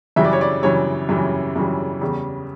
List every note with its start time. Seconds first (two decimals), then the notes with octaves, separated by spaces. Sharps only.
0.16 F#2 C#3 E3 G3 E5
0.24 D5
0.33 C#5
0.41 D5
0.63 F#2 C#3 E3 G3 C#5
1.09 F#2 C#3 E3 G3
1.56 F#2 C#3 E3 G3
2.01 E2 C#3 G3